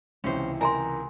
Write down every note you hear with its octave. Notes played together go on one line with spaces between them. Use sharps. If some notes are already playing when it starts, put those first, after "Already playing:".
C#2 C3 E3 C#4 C5
A#4 G#5 A#5 C6